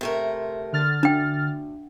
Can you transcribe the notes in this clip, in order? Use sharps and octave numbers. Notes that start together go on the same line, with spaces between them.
C3 A3 A#4
D3 F6 A6
D2 D4 G5